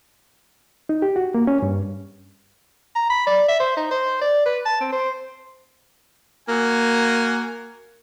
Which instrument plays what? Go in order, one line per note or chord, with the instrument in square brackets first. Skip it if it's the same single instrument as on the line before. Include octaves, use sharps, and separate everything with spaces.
[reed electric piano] D#4
G4
F#4
A#3
C#4
G2
[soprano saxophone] A#5
B5
D5
E5
C5
D#4
C5
D5
B4
A5
C4
C5
[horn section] A#3 F#4 G#5